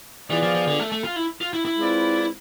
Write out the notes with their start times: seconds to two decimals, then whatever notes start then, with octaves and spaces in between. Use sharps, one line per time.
0.30 E3 B3 F4 G#4 D5
0.43 F3
0.55 F3
0.67 D3
0.79 A3
0.92 A3
1.04 F4
1.16 E4
1.41 F4
1.53 E4
1.65 E4
1.78 G#3 C4 F4 B4 D5